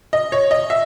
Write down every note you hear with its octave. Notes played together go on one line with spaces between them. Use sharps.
D#5
C#5
D#5
E5